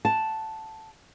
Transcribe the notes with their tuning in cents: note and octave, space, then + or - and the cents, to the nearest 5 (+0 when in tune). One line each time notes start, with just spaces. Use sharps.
F#5 +0 A5 +0